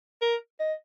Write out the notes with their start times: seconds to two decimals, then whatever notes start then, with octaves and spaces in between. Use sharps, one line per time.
0.22 A#4
0.59 D#5